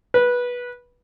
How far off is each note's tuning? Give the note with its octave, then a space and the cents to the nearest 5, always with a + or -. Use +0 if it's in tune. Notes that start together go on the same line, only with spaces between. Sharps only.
B4 -15